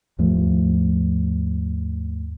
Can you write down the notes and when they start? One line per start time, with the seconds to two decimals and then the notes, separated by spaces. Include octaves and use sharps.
0.19 D#2 G#2 F3 A3